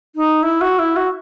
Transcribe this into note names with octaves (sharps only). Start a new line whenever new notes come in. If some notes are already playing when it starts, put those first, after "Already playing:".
D#4
E4
F#4
E4
F#4